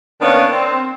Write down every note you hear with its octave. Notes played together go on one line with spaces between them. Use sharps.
D#3 A#3 B3 C#4 D4
C4